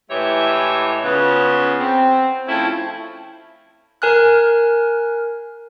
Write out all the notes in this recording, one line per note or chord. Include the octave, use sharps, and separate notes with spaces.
A2 E3 G#3 G4 C#5 E5
C#3 B3 F4
C4
F3 A3 C4 C#4 E4
A#4 G#5 F6 F#6